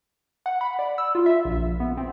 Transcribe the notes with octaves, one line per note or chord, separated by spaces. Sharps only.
F#5
B5
D5
E6
F4
E5
A#1
B3
C4